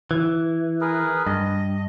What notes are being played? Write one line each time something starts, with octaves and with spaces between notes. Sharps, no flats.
E3
G#4 A#4 B4
G2 D#5